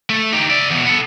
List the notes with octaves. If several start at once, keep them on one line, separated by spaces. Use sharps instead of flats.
A3
D#4 G4
D5 E5
E2 B2
B3 A4